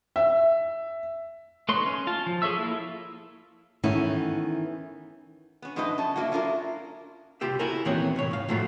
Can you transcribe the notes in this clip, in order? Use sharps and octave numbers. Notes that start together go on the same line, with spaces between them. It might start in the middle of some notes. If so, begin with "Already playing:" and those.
E5
A3 D#4 B4 C#5 C6
C#4
F4 A5
F3
G#4 A4 C#5 E5 E6
A#3 E4 F4 A4
D#3 E3 A3 B3 C#4 E4
B3 C#4
F#2 F3 A3 D#4 B4 D#5
C#4 A5
F#3 A#3 E4 F#4
C#4 D4 F4 G#4 A#4
C2 F4 G4 E5
E4 F#4 A4 A#4 G#5
D#2 A#2 E3 B3 C4 C#5
C2 A2 C#5
G#2 F5
A2 F3 F#3 A3 F4